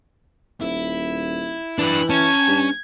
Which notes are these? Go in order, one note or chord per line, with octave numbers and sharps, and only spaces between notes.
D#1 E4
E3 D4 B4 F#6
C#4 G#5 A5 G#6
G2